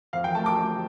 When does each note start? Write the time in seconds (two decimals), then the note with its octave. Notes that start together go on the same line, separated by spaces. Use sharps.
0.13 F2 F5
0.24 G5
0.35 A3 A5
0.46 D6
0.57 A3